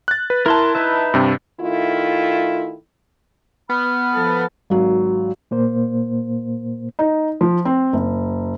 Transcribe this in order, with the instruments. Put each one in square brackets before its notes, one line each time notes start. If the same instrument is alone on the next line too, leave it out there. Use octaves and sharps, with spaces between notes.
[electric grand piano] F#6 A6
B4
[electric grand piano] E4 A5 [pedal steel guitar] A#4 C6
[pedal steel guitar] D#4 B4 E5
[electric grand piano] G2 C3
[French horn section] D#3 A3 E4 F4
[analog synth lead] B3 [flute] B5 [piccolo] F6
[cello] F3 A4
[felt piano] G#1 F#3
[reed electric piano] A#2 A#3 C5
[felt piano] D#4
F3
C4
F#1